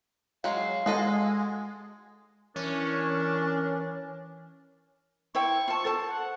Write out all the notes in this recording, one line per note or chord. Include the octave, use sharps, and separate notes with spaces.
F#3 G#3 F5
G#3 F#4 A4 D#5
E3 C#4 D4 A#4
E4 C5 G5 C#6
F4 A5
A4 C5 A5
F#5